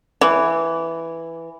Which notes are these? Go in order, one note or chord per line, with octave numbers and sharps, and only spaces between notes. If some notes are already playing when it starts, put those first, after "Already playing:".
E3